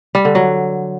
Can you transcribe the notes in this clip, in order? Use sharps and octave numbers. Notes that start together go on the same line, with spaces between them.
G3
D3
F#3